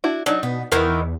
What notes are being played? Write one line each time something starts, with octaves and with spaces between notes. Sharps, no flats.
D4 E4 F#4
F#3 D4 D#4
B2 B3
E2 D#3 E3 B3 A#4